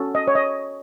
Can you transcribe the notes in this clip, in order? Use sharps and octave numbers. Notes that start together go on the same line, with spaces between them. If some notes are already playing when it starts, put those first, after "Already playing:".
Already playing: C#4 F#4 A4
D#5
C#5
D#5